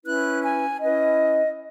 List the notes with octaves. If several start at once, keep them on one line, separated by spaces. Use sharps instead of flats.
C#4 E4 B4 F#6
G#5
C#4 E4 B4 D#5